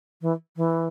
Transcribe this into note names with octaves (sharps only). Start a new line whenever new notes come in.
E3
E3